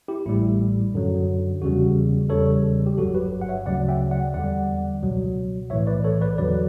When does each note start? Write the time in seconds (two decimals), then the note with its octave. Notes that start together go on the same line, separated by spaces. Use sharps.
0.08 E4 G4
0.26 A1 A2 G3 E4
0.94 F#2 D3 F#3
1.62 E2 C#3 G3 F#4
2.30 E2 C#3 G3 A4 C#5
2.86 G4
2.97 G1 G2 F#3 F#4 A4
3.15 G4 B4
3.41 F#5
3.48 C#5 E5
3.66 D2 C#3 F#3 D5 F#5
3.88 E5 G5
4.11 D5 F#5
4.34 E2 D3 G3 D5 F#5
5.02 C#2 B2 F#3
5.70 B1 A2 E3 C#5 E5
5.87 B4 D5
6.04 A4 C#5
6.21 B4 D5
6.38 E2 D3 F#3 B4 D5